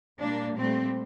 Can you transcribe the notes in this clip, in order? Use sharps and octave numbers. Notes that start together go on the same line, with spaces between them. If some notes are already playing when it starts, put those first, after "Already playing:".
A#2 G3 A#3 D4
A#2 G3 A3 C4